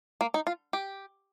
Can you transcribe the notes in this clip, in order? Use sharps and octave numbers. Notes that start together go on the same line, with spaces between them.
A#3
D#4
F4
G4